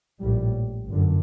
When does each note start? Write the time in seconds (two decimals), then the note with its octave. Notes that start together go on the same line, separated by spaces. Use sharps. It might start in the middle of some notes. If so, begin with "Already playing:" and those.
0.21 A#1 A2 G3
0.89 G1 F#2 D3